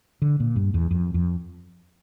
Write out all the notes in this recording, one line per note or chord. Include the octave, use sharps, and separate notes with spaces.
D3
A#2
G2
E2
F2
F2